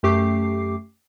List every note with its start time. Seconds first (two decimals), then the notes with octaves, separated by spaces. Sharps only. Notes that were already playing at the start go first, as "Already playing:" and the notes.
0.03 F#2 A3 G4 D6 C7